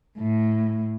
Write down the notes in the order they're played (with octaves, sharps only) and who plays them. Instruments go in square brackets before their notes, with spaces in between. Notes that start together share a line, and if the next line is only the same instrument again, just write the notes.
[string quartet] A2